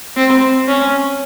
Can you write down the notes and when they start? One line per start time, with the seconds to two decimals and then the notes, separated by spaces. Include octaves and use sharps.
0.16 C4
0.68 C#4